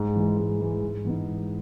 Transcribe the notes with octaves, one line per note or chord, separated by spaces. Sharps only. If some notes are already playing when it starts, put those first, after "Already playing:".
Already playing: G#2
E3 G#3
G#2
E3 G#3
G#2
E3 B3 D#4
G#2